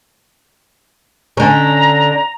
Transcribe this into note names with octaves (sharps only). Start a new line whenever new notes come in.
D3 C#4 A#5